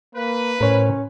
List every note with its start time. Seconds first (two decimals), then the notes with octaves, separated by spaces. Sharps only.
0.15 A#3 B4
0.61 A2 C#4 A#4 C5 C#5